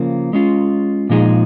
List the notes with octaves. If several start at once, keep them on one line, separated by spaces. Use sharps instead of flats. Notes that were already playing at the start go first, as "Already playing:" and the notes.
Already playing: C#3 F3 A#3
G#3 C#4 F4
A#2 F3 G#3 D#4 G#4